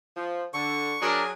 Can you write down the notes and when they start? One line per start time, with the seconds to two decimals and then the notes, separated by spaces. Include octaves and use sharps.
0.16 F3
0.54 D3 C#6
1.01 F#3 D4 F#4 G#4 A#4